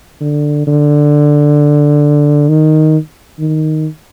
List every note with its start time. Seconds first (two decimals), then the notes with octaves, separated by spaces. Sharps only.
0.21 D3
0.67 D3
2.49 D#3
3.39 D#3